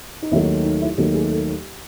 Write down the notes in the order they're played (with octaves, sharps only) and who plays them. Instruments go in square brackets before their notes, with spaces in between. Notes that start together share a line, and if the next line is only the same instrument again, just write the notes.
[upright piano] D#4
D#2 D#3 F#3 A3 E4
D#4
E4
D#2 D#3 F#3 A3 F#4
G#4
A4